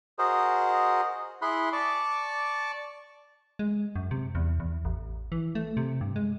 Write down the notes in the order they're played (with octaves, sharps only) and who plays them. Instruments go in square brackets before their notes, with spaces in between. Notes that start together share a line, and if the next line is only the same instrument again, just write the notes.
[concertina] F#4 G#4 A#4 C5 D#5
E4 G#4 B5 C6 F#6
D5 A5 C#6 D6
[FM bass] G#3
F#2
C3
E2
E2
A1
E3
A3
C3
G2
G#3